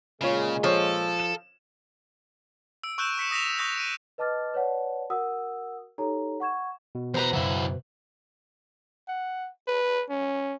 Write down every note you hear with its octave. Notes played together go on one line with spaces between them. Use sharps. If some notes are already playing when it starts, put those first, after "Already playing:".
A#2 C#3 G#3 F4 C#5
F3 A4 C5 C#5
E7
E6 D7
C#6 E6 F#6 G6 D7 E7
C#6 B6 C#7 E7
D#6 A#6 B6 E7 F7
C#6 D#6 G6 A#6 B6
D7 D#7
B4 D#5 A5 D6 F6 A6
B4 C#5 D5 F#5 A5
F#4 A#4 F#5 D#6 E6
D#4 G4 A4 C#5 A#5
F#5 C#6 G#6 E7
B2
E2 B4 C5 A#5
F#2 C#3 F#3 E4
F#5
B4
C#4